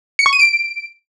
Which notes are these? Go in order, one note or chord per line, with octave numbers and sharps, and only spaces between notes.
C#7
C#6
D#7
D7